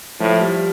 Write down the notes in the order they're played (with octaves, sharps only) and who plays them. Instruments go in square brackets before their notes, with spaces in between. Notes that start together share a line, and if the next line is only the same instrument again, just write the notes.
[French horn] A2 [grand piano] F3
[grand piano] G3